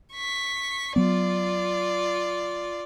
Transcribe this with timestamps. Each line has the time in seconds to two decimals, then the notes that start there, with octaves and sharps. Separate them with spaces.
0.14 C#6 B6
0.96 F#3 B3 F4 D5